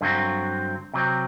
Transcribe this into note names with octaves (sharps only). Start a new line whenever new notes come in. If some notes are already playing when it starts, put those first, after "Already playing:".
G2 D3 F#3 C4
C3 F#3 C4